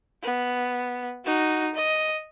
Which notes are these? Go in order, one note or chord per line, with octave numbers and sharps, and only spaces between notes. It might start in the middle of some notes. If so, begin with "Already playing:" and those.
B3
D#4 F#4
D#5